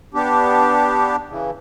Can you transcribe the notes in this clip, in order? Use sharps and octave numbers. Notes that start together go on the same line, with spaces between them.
B3 D4 G4
C#3 E3